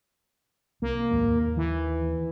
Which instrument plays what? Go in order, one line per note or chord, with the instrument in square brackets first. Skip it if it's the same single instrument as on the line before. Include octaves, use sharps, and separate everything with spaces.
[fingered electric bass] C2 [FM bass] A#3
[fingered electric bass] D#2 G#2
D#2
[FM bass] E3